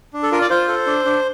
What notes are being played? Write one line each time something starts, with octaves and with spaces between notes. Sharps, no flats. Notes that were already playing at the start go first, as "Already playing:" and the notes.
D4
A4
F4 A#4
D5
F4 C5
A4
D4
D4